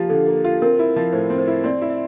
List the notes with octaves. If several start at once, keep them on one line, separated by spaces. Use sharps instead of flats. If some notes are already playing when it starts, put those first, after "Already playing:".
Already playing: F3 A#3 F4 G4
D3 A4
A#3
F4
C4 A#4
E4
F3
A2 C5
C4
C5
E4
C4 D5
E4
E5